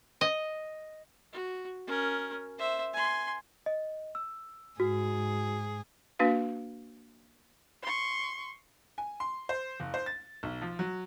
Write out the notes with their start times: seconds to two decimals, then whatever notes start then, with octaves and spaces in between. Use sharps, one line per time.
0.21 D#5
1.32 F#4
1.87 C#4 A#4
2.58 C5 E5
2.93 G#5 C6
3.66 D#5
4.15 E6
4.80 G#2 F#4 G#4
6.19 A#3 D4 F#4 B4 F5
7.83 C6 C#6
8.98 G#5
9.20 C6
9.49 C5
9.80 F#1
9.94 C5
10.06 A6
10.43 B1
10.62 F3
10.79 F#3